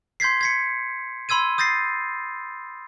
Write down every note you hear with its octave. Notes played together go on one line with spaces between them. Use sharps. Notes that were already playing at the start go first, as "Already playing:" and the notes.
C6 G6 G#6 B6 C7
G#6 B6 C#7
B5 C6 E6 G#6 D#7
D#6 G6 A6 A#6 C7